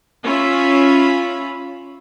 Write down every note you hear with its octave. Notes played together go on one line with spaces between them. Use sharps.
C#4 F4 E5 B5